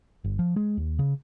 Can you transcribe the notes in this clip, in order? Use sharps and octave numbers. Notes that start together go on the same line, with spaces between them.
G1
F3
G#3
D#2
C#3